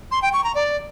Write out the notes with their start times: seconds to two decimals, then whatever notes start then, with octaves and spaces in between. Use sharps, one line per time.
0.11 C6
0.22 G5
0.33 C#6
0.44 A#5
0.55 D5